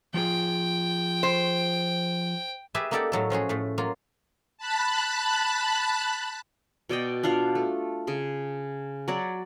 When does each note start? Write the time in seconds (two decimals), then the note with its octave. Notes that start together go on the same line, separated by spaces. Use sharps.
0.14 F3 F4 G#4 G5
1.23 C5
2.74 G4 G#4 B4 E5 G#5 A5
2.91 A#3 D#4 G4 A4 D5 F#5
3.12 A2 F#3 A4
3.30 F3 C#4 F#4 G#4
3.49 A2 A3
3.78 F#3 A#3 F4
4.58 A5 B5 F#6
6.89 B2 D5 D#5 G5
7.23 D4 F4 F5 F#5
7.55 A3
8.07 C#3 G#4
9.08 F#3 F#4 D5